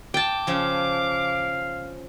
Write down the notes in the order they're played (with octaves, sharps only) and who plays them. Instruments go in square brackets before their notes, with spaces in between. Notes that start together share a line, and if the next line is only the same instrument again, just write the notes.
[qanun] G5 A5 [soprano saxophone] D6
[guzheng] C#3 F3 [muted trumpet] F5